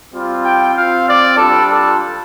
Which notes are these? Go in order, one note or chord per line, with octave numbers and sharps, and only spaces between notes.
G3 C4 F4
G5
C4 F4 F5
D5
G3 D4 F4 A4
A4